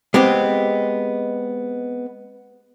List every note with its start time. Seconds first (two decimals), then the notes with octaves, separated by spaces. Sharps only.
0.14 G#3 B3 C4 G4